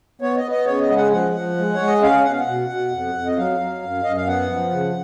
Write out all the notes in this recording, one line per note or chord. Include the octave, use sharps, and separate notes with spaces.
B3 C#5
D#5
B3
D#5
C#3 C#5
D#5
G#3
F#5
F3 F#5
F3
G#3
G#3 C#5
D#5
C#4 F5
B2 F#5
F5
F#5
B2
B2
F2
F2
D#5
F#3 F5
F#3
F#2
F#2 D#5
F5
B3 F#5
F3
C#3